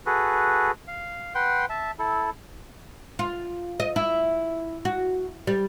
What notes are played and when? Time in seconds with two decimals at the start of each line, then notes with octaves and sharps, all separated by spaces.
0.06 F#4 G#4 A4 B4
0.88 F5
1.35 B4 F#5 G5 C6
1.70 E5 A5
1.99 E4 A4
3.19 F4
3.80 D#5
3.96 E4
4.85 F#4
5.47 G3